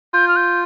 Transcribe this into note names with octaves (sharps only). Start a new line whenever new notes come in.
F4 G6
F6
G6